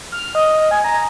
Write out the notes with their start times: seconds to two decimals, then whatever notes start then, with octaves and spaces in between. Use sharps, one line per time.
0.12 F6
0.35 D#5
0.71 G#5
0.84 A#5